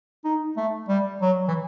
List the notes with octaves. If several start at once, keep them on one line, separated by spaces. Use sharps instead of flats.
D#4
A3
G3
F#3
E3